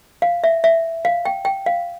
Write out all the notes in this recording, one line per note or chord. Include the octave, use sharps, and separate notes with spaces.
F5
E5
E5
F5
G5
G5
F5